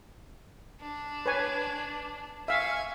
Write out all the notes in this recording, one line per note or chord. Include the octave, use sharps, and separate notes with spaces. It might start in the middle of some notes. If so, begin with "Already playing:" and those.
D4
B4 C#5 G#5
E5 F5 G#5 C#6